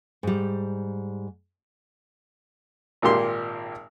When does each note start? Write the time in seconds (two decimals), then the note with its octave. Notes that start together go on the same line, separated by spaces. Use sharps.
0.23 G#2 G3
3.02 G#1 A#2 A#3 G4 C6